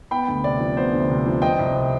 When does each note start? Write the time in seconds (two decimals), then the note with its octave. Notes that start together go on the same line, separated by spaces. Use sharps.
0.11 B3 G5 B5
0.28 D2
0.44 C3 D5
0.60 F3
0.77 B3 C5
0.93 D2
1.10 C3
1.26 F3
1.42 C4 D#5 G5
1.59 C2
1.75 C3